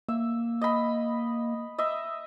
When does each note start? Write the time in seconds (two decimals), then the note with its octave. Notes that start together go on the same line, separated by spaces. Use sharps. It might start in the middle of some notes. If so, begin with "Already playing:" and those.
0.08 A#3 E5
0.61 D#5 B5
1.78 D#5 E5